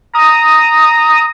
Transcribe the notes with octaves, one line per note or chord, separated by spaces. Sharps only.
A#5 D#6